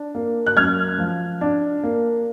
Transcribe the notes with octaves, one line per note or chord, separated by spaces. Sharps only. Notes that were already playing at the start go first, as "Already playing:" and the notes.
Already playing: D4
A#3
F#6
F#2 F6 G#6
F3
D4
A#3